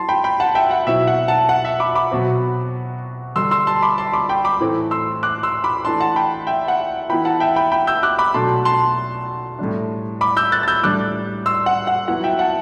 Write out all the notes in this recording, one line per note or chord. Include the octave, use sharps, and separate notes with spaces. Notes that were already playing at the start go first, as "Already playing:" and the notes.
Already playing: F#3 E4 A5 C6
G5 B5
G5 B5
F#5 A5
E5 G5
F#5
B2 F#3 C4 E4 E5
F#5
F#5 A5
F#5
E5
B5 D6
B5 D6
B2 F#3 C4
D3 G3 D4 C6 E6
C6 E6
A5 C6
B5 D6
A5 C6
B5 D6
G5 B5
B5 D6
A2 E3 A3 C4 E4
C6 E6
D6 F#6
C6 E6
B5 D6
E3 A3 D4 A5 C6
F#5 A5
G5 B5
E5 G5
F#5
E3 B3 E4 G5 B5
F#5 A5
E5 G5
G5 B5
G5 B5
E6 G6
D6 F#6
B5 D6
B2 F#3 A3 D4 A5 C6
A5 C6
A2 G3 D4
B5 D6
E6 G6
F#6 A6
A6
E6 G6
A2 G3 D4 D6 F#6
C6 E6
F#5
F#5
F#3 B3 E4 F#5
E5 G5
F#5 A5